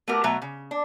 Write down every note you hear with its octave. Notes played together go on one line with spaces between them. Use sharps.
A3 B3 F#4 G4 A#4
B2 F#3 A3 E5 A#5
C#3
D4